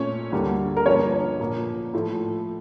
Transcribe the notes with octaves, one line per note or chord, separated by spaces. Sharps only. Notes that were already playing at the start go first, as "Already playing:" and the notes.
Already playing: A#2 A3 C#4 C#5
D2 D3 G3 A#3
A#4
G2 D3 F3 A#3 C#4 C#5
A#2 F3 A#3
A2 F3 A3